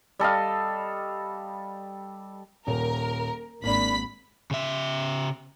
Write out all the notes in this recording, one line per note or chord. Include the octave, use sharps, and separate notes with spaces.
G3 A4 D#5 F5
D#1 A#4
G#1 A#3 D4 B5 B6
C#3 E5